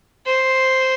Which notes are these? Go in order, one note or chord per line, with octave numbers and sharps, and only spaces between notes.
C5